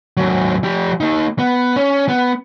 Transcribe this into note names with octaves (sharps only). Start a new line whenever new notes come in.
D#2 F#3
F3 G4
A#3 D#4
B3
C#4
B3